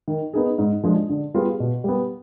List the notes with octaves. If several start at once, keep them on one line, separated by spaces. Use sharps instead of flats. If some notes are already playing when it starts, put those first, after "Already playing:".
D#3
B3 D#4 G#4
G#2
F3 G#3 D4
D3
G3 B3 F4 G#4
B2
G3 B3